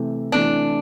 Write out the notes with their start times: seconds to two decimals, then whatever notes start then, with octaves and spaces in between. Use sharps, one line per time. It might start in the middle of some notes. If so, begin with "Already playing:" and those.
Already playing: C3 E3 A3
0.32 C3 E3 A3 D4